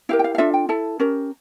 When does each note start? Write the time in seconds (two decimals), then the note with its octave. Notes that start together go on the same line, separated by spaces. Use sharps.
0.09 E4 G4 A#4 F5
0.19 G5
0.24 F5
0.35 F5
0.38 D4 F4 A4 E5
0.54 G5
0.69 E4 A4 A5
1.00 C#4 G4 A#4